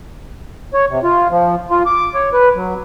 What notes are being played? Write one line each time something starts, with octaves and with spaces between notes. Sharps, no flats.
C#5
C3
F4
F3
F4
D6
C#5
B4
F#3